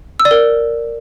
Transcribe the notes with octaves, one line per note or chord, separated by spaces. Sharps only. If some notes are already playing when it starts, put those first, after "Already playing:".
E6
D5
A#4